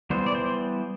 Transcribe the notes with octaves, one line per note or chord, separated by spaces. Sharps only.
E3 G3 B3 C5
D5
C5